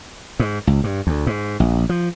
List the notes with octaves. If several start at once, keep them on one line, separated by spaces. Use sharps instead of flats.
G#2
C#2
G2
D2
G#2
A#1
F3